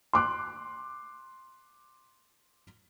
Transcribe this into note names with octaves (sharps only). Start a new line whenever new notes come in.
C6 D6 F#6